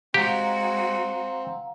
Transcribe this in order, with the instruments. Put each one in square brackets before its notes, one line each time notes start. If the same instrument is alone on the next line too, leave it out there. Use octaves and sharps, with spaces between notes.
[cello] G#3 F#4 [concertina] C4 [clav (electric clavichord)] G4 [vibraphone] F5 F#5 A#5